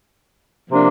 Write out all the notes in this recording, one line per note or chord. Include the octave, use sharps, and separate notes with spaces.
C3 F3 A#3 D4